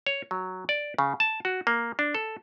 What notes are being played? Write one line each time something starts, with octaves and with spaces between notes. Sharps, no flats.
C#5
F#3
D5
C#3
A5
F#4
A#3
D4
A4